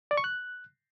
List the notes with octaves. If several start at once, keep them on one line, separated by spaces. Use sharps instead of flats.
D5
C#6
F#6